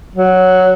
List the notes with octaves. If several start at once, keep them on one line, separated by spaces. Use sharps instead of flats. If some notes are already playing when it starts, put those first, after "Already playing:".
F#3